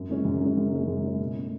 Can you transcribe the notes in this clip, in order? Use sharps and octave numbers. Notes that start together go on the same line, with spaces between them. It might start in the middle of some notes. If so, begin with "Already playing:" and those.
Already playing: F#2
C#3 G#3 C#4
F#2
C#3 G#3 C#4
F#2
C#3 G#3 C#4
F#2
C#3 G#3 C#4
B2
A3 C#4